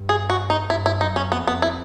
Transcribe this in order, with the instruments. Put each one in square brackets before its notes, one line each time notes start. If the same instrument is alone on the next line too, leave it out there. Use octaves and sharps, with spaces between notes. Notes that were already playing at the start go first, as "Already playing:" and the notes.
Already playing: [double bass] G2
[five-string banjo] G#4
F#4
D#4
[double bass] G2 [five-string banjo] E4
[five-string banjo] E4
[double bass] F#2 [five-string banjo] D#4
[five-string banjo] C#4
[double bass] F2 [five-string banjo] B3
[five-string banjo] B3
E4